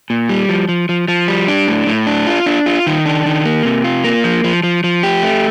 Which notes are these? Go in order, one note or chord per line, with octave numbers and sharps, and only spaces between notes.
A#2
G3
F3
F3
F3
F3
G3
D4
A2
A2
D4
F4
D4
F4
D#3
D4
D#3
A#3
C3
F4
A#3
F3
F3
F3
F3
G4
A3